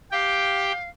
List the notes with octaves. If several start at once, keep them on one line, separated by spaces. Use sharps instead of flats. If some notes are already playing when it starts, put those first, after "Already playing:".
G4 F5 G5